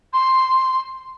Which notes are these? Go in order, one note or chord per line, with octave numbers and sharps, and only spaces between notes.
C6